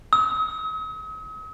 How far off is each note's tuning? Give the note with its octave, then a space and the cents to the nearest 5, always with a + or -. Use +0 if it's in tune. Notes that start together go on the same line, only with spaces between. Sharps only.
D#6 +45